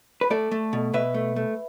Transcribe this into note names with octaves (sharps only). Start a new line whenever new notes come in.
B4
A3 A4 D5
A3
B2
B2 B4 E5
A3
A3